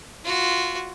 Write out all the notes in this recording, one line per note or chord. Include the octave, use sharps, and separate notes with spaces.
F4 F#4